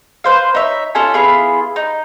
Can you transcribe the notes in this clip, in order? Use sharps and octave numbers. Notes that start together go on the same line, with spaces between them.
B4 C5 F5
D#4 C#5 E5
C#4 F4 A4 G#5
B3 E4 F4 G#4
D#4